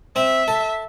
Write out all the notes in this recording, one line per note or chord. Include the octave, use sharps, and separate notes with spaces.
C4 E5
A4